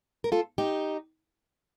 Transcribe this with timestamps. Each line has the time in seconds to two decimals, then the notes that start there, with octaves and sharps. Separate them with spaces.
0.24 A#4
0.32 F4 A4
0.58 D#4 G4